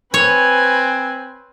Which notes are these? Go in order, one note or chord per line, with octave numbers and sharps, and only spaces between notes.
C4 B4 C#5 G#5